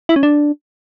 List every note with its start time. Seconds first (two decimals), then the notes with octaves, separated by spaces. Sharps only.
0.09 E4
0.16 C#4
0.23 D4